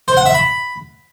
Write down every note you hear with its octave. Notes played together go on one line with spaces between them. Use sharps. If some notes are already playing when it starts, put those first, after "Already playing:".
C5
F#5
E5
B5